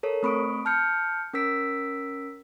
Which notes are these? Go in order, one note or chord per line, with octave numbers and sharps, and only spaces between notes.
A4 A#4 C#5
A3 C4 B5 C#6 D#6 D7
A5 F6 G6 C#7
C#4 A#4 E6 B6 D7